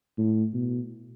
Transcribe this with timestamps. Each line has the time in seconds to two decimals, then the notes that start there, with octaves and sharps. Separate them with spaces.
0.18 A2
0.54 B2